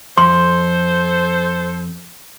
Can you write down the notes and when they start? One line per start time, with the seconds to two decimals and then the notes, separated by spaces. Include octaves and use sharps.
0.18 F2 A4 C5 C6